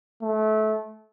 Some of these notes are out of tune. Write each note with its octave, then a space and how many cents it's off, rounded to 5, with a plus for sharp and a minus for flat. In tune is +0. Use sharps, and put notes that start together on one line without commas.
A3 -25